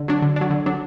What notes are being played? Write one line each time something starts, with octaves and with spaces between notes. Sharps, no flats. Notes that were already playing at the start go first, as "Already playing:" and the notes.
Already playing: D3
F#3 D4
D3
F#3 D4
D3
F#3 D4